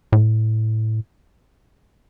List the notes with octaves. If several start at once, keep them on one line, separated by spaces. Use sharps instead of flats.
A2